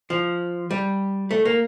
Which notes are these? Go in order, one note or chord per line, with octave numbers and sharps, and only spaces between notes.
F3
G3
A3
A#3